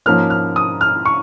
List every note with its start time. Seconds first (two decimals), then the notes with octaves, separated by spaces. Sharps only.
0.06 G#2 F3 A#3 C#4 F6
0.30 F6
0.56 D#6
0.81 F6
1.06 C#6